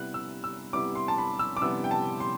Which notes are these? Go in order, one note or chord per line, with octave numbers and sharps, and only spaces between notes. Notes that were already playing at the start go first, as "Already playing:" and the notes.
Already playing: C3 G3 B3 E4 F#6
E6
E6
C3 G3 B3 E4 D6
C6
A5
B5
E6
D6
C3 G3 B3 E4 E6
G5
A5
C6